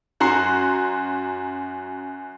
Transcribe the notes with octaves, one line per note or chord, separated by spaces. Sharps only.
F#2 F#4 A#5 C6 C7